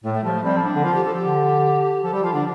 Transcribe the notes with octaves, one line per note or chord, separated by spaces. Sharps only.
A2 A3
A3
F3 G3
A3
G3 C4
F3
D4
D3
F3 F4
G4
A4
G4
D3
F3 A4
G3 G4
F3 F4
D3 D4